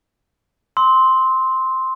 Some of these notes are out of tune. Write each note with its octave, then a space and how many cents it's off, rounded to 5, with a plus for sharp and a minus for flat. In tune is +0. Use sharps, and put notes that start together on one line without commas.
C6 +0 E6 -35